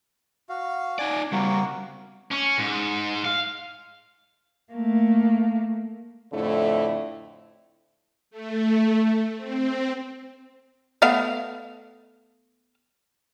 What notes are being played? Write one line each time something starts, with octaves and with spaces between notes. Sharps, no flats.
F#4 F5
D#4 D5 G#5
C#3 G3 A#3 F#4
C#4
G#2
F5
A3 A#3
F2 A2 D3 A3 C4 E4
A3
C4
A3 B3 F5